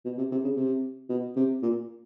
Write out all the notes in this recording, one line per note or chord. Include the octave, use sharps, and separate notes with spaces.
B2
C3
C3
C#3
C3
B2
C3
A#2